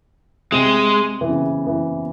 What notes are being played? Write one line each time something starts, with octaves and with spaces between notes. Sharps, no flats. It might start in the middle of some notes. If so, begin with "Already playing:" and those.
C3 G#3
E3
C#3
E3